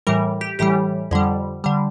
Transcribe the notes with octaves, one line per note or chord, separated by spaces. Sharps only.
A2 E3 G3 A#4
G4
A2 E3 G3 G4
F2 D3 G3
D3 G3